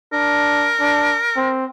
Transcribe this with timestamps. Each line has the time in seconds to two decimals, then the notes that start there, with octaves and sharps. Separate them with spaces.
0.13 D4 A#4
0.81 D4
1.37 C4